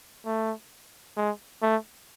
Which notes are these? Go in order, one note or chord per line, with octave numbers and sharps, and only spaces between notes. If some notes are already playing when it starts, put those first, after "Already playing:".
A3
G#3
A3